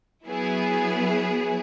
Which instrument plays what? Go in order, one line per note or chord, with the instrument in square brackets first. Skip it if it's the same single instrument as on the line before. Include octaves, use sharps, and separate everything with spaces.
[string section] F#3 B3 E4 G#4